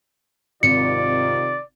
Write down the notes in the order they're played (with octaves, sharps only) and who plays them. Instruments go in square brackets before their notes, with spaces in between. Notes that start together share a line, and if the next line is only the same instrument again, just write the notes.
[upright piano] G#1 [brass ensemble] C3 D#3 F4 [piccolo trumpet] D5 [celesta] C#7